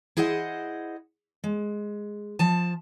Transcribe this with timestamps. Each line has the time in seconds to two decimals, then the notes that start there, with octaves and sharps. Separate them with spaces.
0.17 E4 G#4 C5 D#5 F#5
1.44 G#3
2.39 F3 A5